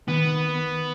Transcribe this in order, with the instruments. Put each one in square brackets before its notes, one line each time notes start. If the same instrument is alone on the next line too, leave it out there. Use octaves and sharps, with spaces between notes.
[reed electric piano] D#3 [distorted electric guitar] B3